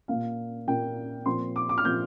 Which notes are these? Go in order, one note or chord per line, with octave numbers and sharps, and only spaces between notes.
A#2 A#3 F5
A#2 A#3 G5
A#2 F3 C4 C6
D6
D6
F6
A#2 F3 C4 G6